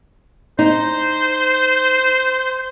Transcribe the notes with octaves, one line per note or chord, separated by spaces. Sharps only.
D#4 C5